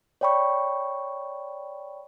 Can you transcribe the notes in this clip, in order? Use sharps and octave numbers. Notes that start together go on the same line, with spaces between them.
C#5 D5 G5 B5 C#6